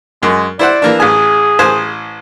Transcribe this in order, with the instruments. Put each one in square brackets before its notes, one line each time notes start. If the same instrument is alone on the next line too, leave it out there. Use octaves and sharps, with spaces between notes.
[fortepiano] F#2 [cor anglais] G#3
[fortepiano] E4 C5 F#5 [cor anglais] D5
[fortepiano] E3 A#3 D4
[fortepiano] A1 G#5 [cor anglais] G#4
[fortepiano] A1 C5 G#5